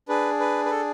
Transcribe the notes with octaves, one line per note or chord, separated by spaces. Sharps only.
D4 G#4 B4
B4
B4
A4